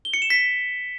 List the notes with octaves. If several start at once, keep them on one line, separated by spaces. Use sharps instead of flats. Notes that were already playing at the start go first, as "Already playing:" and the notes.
G7
C#7
E7
B6